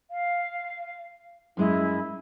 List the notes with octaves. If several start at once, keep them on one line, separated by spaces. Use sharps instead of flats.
F5
F#2 G#3 E4 D#5